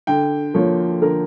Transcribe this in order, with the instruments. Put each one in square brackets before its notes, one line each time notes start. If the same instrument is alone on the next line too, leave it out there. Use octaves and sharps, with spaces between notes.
[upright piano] D3 G5
F3 A#3 C#5
D3 A#4